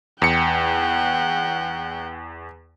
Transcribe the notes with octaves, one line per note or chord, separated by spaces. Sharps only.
E2 F#5 G5 C#7